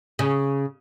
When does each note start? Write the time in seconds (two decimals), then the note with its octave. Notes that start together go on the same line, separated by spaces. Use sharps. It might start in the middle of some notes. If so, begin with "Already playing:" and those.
0.19 C#3